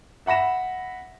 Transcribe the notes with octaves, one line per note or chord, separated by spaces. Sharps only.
E5 F#5 B5 A#6 E7